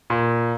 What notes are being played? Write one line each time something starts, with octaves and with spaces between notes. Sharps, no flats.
A#2